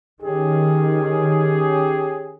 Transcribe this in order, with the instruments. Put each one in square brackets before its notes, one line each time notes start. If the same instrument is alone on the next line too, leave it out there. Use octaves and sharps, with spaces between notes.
[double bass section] D#3 [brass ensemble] C#4 G4 G#4